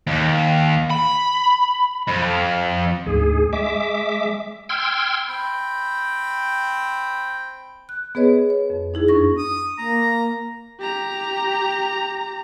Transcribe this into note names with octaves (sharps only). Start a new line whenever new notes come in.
D#2
B5
F2
D2 G#2 G#4
G#3 E5 D6
G5 C6 E6 F6 G#6
C4 G5 B5
F#6
B3 G#4 B4 C#5 D#5
C#5
F2
D#4 E4 G#4
F#2 D4 C#6 A#6
D#6
A#3 A#5
G4 A#5